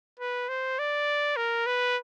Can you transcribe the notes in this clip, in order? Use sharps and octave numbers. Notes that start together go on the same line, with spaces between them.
B4
C5
D5
A#4
B4